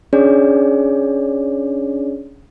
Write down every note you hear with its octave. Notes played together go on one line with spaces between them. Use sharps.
C#4 D4 G#4 C#5 D5